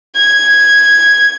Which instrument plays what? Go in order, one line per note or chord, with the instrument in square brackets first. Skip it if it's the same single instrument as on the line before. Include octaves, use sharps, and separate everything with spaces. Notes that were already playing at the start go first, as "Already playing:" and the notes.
[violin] G#6